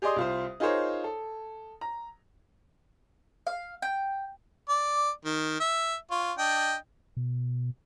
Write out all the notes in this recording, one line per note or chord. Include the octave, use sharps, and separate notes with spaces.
G4 G#4 D5 D#5 C6 D#6
C2 F4 C5
D#4 F4 G#4 A#4 C5 C#5
A4
A#5
F5
G5
D5
D#3
E5
F4 C#5
D4 D#5 G5
B2